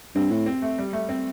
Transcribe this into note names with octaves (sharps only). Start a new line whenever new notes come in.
G2 C4
A2
C4
A3
G3
A3
C4